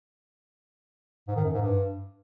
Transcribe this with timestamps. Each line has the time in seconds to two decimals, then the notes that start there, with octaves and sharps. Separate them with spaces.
1.28 G#2
1.36 D#3
1.45 F#2
1.53 G#2
1.61 G2